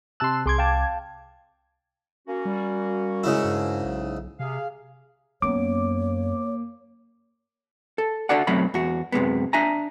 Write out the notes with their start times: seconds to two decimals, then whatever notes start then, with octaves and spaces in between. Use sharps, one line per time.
0.20 C3 A5 C6 E6 F#6
0.46 C2 G#4 C6 D6 G#6
0.58 F5 G5 A5
2.28 A#3 C#4 F#4
2.45 G3
3.24 G#2 C#3 E4
3.45 G2
3.85 B1
4.40 C3 G#4 F5
5.42 F#2 A#3 B3 C#5 D6
7.98 A4
8.29 D4 F#4 A4 D5 F#5
8.47 B1 F#2 F#3 A3 C4 B5
8.74 E2 F#4
9.12 F#2 C3 G#3 B3
9.53 D4 E5 G#5 A#5